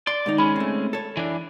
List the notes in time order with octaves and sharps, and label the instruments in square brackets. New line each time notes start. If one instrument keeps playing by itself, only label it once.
[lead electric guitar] D5 [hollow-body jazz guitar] C6
[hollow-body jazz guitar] G#2 D#3 D#4
[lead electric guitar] G#3 C#4 [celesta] B5
[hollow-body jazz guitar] A3 C4
A4 C#5
[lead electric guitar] E3 D4